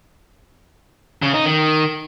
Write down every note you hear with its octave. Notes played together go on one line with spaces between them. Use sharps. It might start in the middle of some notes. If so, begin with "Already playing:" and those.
C#3
D#4
D#3